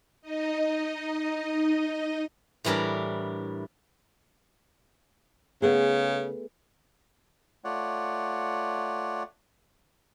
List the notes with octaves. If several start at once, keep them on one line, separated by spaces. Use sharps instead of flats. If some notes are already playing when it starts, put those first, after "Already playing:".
D#4 D#5
A2 E3 G3 D4 A#4
C#3 A3 B3 G#4
A3 F4 C#5 D5 F#5